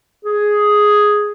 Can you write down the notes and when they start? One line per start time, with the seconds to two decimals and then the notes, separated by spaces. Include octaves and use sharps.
0.25 G#4